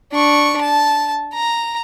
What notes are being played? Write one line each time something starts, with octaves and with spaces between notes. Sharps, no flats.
D4 C#6
A5
A#5